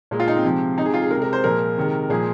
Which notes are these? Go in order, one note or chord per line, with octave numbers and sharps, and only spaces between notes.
A#2 G#3
F4
D#4
C4
C3 F3 G#3
C3 G#3 D#4 G#4
F4
G#4
C3 G#3 A#4
A#4
C5
A#2 F3 G#3 A#4
C3 D#3 G#3
A#2 F3 G#3 G#4